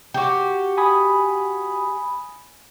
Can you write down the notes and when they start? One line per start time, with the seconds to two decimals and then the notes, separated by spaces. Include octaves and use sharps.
0.14 F#4 G4
0.77 G#5 B5 D#6